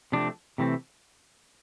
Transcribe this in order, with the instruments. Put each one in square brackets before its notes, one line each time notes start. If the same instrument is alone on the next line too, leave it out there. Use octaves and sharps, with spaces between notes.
[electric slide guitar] C3 F3 A3 C4 D4
C3 E3 A3 C4